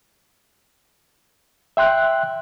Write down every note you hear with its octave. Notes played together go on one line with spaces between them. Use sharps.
E5 G5 C6 F#6